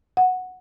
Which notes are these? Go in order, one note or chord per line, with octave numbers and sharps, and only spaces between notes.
F#5